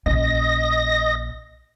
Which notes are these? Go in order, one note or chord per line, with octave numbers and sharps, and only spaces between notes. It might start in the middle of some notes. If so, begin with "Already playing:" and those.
A#1 C#4 D#5 A#6